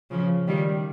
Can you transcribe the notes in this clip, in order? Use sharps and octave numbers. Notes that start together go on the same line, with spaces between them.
C#3 F3
D#3 G3